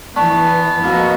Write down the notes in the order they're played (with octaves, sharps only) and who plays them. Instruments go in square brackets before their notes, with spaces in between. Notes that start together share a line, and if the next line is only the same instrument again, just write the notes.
[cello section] E3 [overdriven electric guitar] B3 [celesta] D5 A5 C#6
[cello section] F2 F#4 D#5 [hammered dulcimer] B2 A#3 A4